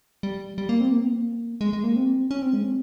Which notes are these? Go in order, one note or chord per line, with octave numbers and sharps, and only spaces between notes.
G3
G3
A#3
C4
A#3
C4
A#3
G#3
G#3
A#3
C4
C#4
C4
G#3
C4